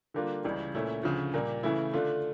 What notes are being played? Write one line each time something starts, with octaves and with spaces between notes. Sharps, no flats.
D3 G3 A#3 D4 F4
C#2 C#3 E3 G3
A#2 A3 C#4 E4
D2 C#3 F3
A#2 G3 A#3
C#3 E3 A3 E4
D3 A3 D4 F4